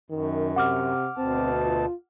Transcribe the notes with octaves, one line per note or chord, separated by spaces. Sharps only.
F#2 D#3
C3 F#5 D6 F6
D2 B2 C4 A5
F4